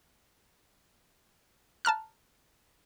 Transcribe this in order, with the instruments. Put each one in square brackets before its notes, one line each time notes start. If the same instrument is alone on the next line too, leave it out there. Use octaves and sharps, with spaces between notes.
[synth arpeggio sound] A5 A#5 F6 F#6